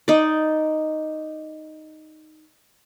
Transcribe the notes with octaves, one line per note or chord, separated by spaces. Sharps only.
D#4 D5